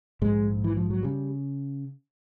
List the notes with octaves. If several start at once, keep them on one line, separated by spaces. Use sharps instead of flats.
A#1 G#2 G#3
E3
F3
F#3
C#3 G3